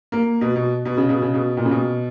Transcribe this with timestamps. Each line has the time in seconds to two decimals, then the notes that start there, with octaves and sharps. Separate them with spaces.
0.12 A#3
0.41 B2
0.56 B2
0.85 B2
0.97 C#3
1.09 B2
1.22 C#3
1.34 B2
1.57 A#2
1.65 C#3
1.71 B2